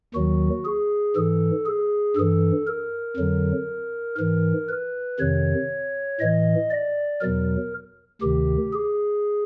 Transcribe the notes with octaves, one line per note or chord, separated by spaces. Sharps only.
D#2 D#3 F#3 F#4
G#4
G#2 E3 A4
G#4
G2 E3 A4
A#4
F2 D3 F#3
G#2 E3 A#4
B4
F2 C3 D#3 C#5
A2 E3 D#5
D5
E2 B2 F#3 A#4
D2 C3 D#3 G4
G#4